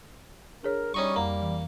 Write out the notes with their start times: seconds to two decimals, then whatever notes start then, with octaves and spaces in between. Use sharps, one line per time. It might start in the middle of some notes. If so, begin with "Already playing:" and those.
0.63 D4 G#4 A#4 C#5
0.94 G3 C#4 D#4 C#6
1.16 F2 A#3 A#5
1.42 E3